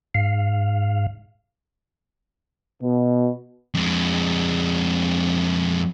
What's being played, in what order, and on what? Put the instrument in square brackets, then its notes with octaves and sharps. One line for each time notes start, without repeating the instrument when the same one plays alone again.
[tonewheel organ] G#2 F5
[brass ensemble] B2
[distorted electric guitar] F2 G#3